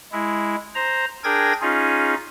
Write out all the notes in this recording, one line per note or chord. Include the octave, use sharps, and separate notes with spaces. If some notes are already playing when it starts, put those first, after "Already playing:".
G#3 E4
C5 A#5
D4 G#4 A#4 G5 G#6 A#6
C#4 D#4 F4 G#4